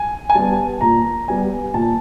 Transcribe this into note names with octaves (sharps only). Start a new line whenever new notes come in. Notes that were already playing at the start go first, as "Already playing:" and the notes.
Already playing: G#5
G#5
G3 B3 A5
A#2 A#5
G3 B3 G#5
A#2 A5